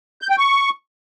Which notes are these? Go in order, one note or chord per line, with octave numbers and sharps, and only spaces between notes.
G6
G5
C#6